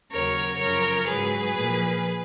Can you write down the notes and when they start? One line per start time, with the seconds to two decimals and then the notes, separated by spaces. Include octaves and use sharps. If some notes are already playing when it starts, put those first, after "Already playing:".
0.11 D#2 C#3 F#3 A#4 C#5
0.60 F#2 C#3 F3 A#4 C#5
1.08 G#2 F#3 G#4 B4
1.57 A#2 F3